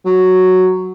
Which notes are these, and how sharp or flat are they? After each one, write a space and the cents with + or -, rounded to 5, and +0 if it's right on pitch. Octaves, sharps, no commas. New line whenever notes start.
F#3 +0